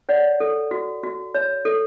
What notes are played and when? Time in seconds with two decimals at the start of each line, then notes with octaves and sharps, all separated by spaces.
0.09 C#5 D5 F#5
0.40 A4
0.71 F#4
1.03 F#4
1.34 C#5
1.65 A4